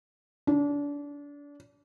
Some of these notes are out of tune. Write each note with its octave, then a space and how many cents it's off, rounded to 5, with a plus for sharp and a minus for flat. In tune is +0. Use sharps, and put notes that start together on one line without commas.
D4 -30